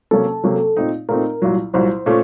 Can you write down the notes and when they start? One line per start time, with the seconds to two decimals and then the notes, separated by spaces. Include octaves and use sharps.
0.11 C3 F#3 A#3 C#4 A4
0.44 C3 F#3 A#3 C#4
0.77 A#2 A3 C4 D#4
1.09 A#2 A3 C4 D#4 A#4
1.42 C2 A#2 F#3
1.74 C2 A#2 F#3 C5
2.06 A#2 A3 C#4